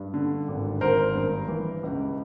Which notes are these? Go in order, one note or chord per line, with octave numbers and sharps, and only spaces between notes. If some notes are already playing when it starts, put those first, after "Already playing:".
Already playing: G2
D3
G#1
G#1 A#4 C5
G2
E3
C#2